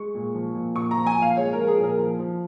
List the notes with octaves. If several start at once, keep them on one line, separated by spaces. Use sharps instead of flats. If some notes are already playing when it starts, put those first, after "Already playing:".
Already playing: G#3 C#6
A#2
F3
A#2
A#2 C#6
A#5
F3
G#5
A#2
F5
G#3 C#5
F3 A#4
G#4
A#2
A#4
F3
F3